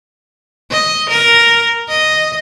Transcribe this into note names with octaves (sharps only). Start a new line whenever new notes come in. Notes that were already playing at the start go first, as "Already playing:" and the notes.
D#5
A#4
D#5